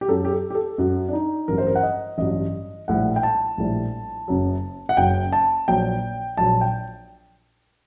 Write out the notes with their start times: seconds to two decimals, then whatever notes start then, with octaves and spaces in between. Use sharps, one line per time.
0.01 G4
0.08 F#2 F#3 A4
0.25 G4
0.32 A4
0.50 G4
0.55 A4
0.78 F#2 F#3 F#4
1.09 D4
1.13 D#4
1.48 A1 G2 F#3 A#4
1.58 C5
1.67 A#4
1.75 F#5
1.83 D#5
2.18 A1 G2 F#3 D#5
2.88 A#1 A2 G3 F#5
3.16 G5
3.23 A5
3.58 A#1 A2 G3
4.28 F#1 F#2 F#3
4.89 F#5
4.97 F#1 F#2 F#3 G5
5.32 A5
5.68 A#1 A#2 F#3 G5
6.37 A#1 A#2 F#3 A5
6.61 G5